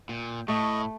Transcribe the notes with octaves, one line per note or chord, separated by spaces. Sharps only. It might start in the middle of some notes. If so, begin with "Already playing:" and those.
A#2 G5
A2 A3 D#5 C#6